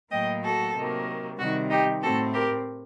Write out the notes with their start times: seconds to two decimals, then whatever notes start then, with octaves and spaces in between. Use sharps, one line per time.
0.11 A2 F#3 A#3 D#5 G5
0.43 F#4 A4
0.75 C3 D#3 F#3 A#3
1.38 C3 D#3 G3 F#4
1.69 D#4 G4
2.02 A2 A3 C4 F#4 A4
2.33 G4 A#4